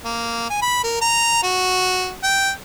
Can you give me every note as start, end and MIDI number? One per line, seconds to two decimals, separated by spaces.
0.05 0.46 58
0.49 0.58 80
0.62 0.79 83
0.84 0.97 70
1.01 1.43 82
1.43 2.12 66
2.23 2.51 79